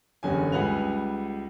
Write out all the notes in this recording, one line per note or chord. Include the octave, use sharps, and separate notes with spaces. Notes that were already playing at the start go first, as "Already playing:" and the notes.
F#1 E2 D3 C#4 G4 G#5
C#2 G3 B4 F#5 G#5 F7